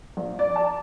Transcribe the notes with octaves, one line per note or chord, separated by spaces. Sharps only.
A#1
D5
A5